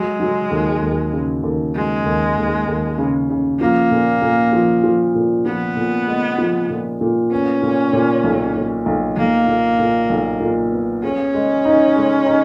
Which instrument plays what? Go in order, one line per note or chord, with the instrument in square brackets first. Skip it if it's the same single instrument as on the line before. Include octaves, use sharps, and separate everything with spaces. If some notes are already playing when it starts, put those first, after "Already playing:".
Already playing: [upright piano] F#3 [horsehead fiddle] G#3
[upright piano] F#3
D#2
D#2
C#3
D#2
[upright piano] F#3 [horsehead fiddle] G#3
[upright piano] D#2
D#2
D#2
C#3
C#3
[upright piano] F3 [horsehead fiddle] A#3
[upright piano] A#2
A#2
F3
F3
A#2
[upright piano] F3 [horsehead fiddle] B3
[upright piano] A#2
G#3
F3
A#2
A#2
[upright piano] B3 [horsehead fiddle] C#4
[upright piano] A#2
A#2
B1
A#2
B1
[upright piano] B1 [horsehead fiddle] A#3
[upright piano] A#2
A#2
B1
A#2
B3
[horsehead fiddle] C#4 [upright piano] G#4
[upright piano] G#3
D#4
G#3
D#4